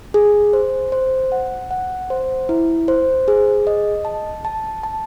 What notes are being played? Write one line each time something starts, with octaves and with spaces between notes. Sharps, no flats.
G#4
C5
C5
F#5
F#5
C5
E4
C5
G#4
D#5
A5
A5
A5